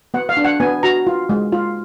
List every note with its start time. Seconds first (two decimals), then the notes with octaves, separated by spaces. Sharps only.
0.14 B3 F#5
0.29 F5
0.37 D4
0.45 F#5
0.60 B3 G#5
0.83 F#4 A#5
1.07 F4
1.29 G#3
1.53 F4